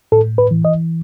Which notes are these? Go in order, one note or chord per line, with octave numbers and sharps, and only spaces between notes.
A2 A4
B4
E3
D#5